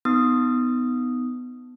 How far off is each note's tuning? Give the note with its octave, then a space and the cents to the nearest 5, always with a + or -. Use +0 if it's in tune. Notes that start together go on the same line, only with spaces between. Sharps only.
B3 +20 D#4 +0 D#6 +0